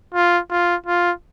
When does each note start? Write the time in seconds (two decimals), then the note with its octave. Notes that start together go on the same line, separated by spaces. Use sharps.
0.14 F4
0.50 F4
0.87 F4